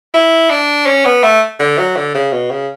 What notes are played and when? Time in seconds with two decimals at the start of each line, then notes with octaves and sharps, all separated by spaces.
0.14 E4
0.50 D4
0.86 C#4
1.05 B3
1.24 A3
1.60 D3
1.78 F#3
1.96 D3
2.14 C#3
2.33 B2
2.51 C#3